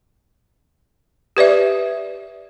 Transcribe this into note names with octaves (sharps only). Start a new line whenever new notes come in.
G4 B4 D5 E5